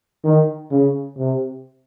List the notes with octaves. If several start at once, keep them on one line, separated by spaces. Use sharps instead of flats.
D#3
C#3
C3